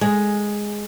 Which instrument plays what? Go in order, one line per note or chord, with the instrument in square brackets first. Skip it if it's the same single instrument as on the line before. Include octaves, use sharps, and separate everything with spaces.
[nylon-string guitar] G#3